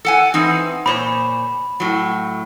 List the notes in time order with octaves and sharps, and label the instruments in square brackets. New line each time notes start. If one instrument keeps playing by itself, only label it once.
[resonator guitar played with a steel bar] A4 F#5 G#5
E3 C4 D#4
[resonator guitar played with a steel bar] A#2 C5 C#5 [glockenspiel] B5
[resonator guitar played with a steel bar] A2 F#3